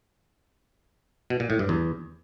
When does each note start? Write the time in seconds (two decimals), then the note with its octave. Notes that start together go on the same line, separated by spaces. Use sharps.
1.30 B2
1.40 A#2
1.50 A2
1.59 G2
1.69 E2